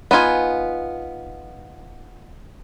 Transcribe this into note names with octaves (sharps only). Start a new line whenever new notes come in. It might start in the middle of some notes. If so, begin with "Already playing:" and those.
B3 D#4 F4 G#5